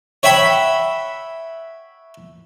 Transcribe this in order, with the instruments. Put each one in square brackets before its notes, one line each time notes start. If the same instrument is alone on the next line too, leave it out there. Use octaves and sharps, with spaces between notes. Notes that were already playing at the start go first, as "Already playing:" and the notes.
[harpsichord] C#5 E5 F#5 G5 B5